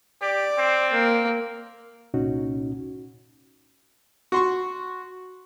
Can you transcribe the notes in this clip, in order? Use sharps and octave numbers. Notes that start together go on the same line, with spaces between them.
G4 D5
C4
A#3
C2 A#2 C#4 D#4 F#4
F#4 C6 C#6